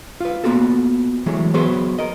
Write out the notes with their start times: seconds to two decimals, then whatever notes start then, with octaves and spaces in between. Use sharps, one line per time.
0.20 F4 B4
0.44 A#3 B3 F4 F#4 A4
1.26 E3 F#3 G#3 A3
1.54 F#3 B3 G#4 B4 C5
1.99 A#4 D#5